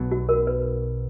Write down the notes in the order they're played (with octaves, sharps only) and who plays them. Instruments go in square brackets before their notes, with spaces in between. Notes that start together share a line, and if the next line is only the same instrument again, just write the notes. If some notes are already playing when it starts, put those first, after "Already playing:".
Already playing: [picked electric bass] B1 B2 F#3
[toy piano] F#4
A#4
B4